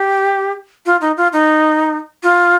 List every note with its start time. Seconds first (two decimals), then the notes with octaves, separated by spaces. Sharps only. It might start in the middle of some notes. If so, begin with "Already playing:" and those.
Already playing: G4
0.86 F4
1.01 D#4
1.17 F4
1.33 D#4
2.23 F4